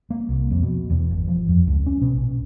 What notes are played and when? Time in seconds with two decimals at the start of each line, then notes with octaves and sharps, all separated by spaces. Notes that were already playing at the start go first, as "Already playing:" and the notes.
0.10 A#3
0.29 C2
0.51 F2
0.63 B2
0.90 E2
1.11 G1
1.27 F3
1.48 F2
1.67 C#2
1.86 C#4
2.01 B2
2.13 A#1